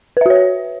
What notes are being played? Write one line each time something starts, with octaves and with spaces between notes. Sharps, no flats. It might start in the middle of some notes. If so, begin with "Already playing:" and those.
F#4 B4 C#5 E5